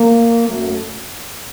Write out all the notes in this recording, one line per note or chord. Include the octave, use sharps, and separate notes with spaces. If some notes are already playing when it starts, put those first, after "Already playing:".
Already playing: A#3
F#2 F#3 A3